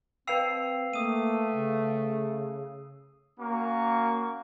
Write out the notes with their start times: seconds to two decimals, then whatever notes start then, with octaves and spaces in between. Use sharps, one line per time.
0.27 C4 B4 F5 G5 E6 C7 F7
0.93 A3 A#3 D#6 D#7
1.51 C#3
3.40 A#3 C#4 F#4 C#6